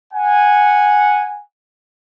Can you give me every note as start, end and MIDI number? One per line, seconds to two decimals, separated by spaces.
0.13 1.42 78
0.13 1.42 80